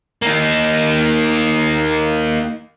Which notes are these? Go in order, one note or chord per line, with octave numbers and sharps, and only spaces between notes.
A#3 D#4